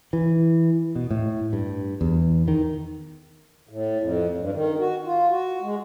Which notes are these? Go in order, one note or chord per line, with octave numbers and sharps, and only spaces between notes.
E3
B2
A2
G2
E2
D#3
A2
F2
G2
D#3
F#4
F4
F#4
G#3